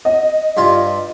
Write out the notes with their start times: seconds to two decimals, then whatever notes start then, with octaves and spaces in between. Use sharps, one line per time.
0.05 D#5
0.57 G2 F4